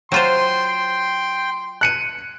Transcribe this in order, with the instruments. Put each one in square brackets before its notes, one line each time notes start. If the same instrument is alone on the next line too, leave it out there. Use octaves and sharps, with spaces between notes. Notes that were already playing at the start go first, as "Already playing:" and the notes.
[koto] F#3 F4 C5 [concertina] G5 [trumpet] C6
[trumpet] C6
[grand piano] F#6 C#7 D#7